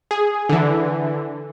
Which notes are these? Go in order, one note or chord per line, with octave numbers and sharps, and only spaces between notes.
G#4
D3 E3